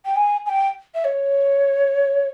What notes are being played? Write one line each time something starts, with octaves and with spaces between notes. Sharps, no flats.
G5
G#5
G#5
G5
E5
C#5